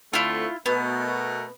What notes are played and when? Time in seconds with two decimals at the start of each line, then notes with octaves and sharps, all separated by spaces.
0.13 D3 A3 C4 E4 F4
0.66 B2 A3 B3 A#4